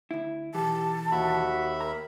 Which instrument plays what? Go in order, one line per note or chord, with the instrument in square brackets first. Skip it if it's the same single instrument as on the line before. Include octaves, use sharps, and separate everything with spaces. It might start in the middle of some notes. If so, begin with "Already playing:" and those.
[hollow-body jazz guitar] D2 E4
[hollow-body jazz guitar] B1 E3 [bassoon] G4 [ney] A5
[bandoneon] D#2 E5 B5 [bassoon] F#4
[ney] A#4 [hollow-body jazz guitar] A#5